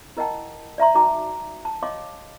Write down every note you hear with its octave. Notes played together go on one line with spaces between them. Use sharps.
E4 A#4 D#5 F#5 G5 A5
D5 E5 A#5 C6
D#4 F#4 G5 A#5 D6
A5
C#5 D#5 F5 C6 D6